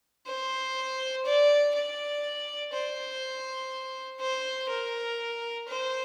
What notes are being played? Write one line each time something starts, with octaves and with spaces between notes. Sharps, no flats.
C5
D5
D5
C5
C5
A#4
C5